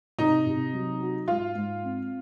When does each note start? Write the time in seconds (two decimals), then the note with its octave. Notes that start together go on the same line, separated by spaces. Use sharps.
0.19 C3 D#4
0.46 C3
0.73 F#3
1.00 F#4
1.28 G#2 F4
1.55 G#2
1.83 C4